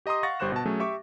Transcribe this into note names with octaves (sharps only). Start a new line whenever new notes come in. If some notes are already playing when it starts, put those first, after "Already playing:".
G4 D#5 A#5 C6 D#6
F5 F#5 C#6 A6 A#6
G1 G3 C5 C#6 F#6 E7
B2 A5
F#3 A3 C#4 G#4
G4 E5 C#6 D6